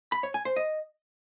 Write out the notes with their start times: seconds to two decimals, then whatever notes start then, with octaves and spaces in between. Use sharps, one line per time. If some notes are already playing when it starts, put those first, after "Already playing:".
0.12 B5
0.23 C#5
0.34 G#5
0.45 C5
0.56 D#5